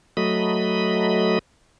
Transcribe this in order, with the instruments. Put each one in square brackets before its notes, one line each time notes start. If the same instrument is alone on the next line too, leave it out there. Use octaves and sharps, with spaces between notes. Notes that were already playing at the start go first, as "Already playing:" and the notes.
[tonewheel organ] F#3 A3 D#5 B5